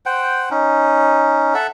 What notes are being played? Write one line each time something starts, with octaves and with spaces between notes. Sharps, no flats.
C5 F#5 G5
C#4 D#4
A4 E5 F#5